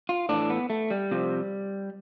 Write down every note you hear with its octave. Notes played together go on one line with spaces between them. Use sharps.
F4
A2 E3 D4
B3
A3
G3
C3 F3